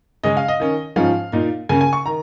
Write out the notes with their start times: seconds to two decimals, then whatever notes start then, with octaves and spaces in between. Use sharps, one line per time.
0.23 C#3 G#3 C#4 D#5
0.37 F5
0.48 D#5
0.60 D#3 C#4
0.96 G#2 F3 C#4 F5
1.32 A#2 A#3 D#4
1.69 C#3 A#3 C#4 G#5
1.81 G#5
1.93 C#6
2.06 D#3 A#5